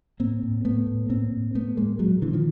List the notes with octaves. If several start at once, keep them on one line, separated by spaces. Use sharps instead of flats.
A2 A#3 C4
A2
A2 A3 B3
A2
A2 A#3 C4
A2
A2 A3 B3
A2 G#3 A#3
A#2 F#3 G#3
A#2 D3 E3
D#3 F3